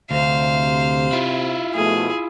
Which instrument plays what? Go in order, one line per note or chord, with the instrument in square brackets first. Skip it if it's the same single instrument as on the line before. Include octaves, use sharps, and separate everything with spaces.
[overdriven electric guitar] D2 [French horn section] C3 [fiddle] C5 F5
[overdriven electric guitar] E4 F4
[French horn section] B2 F3 A3 [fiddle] G#4